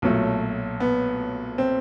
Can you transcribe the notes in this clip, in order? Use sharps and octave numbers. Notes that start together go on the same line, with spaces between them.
B1 A#2 F#3 A3
B3
C4